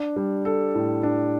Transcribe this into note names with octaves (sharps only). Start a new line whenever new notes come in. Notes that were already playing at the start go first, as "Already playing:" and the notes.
Already playing: D4
G3
A4
A2
D4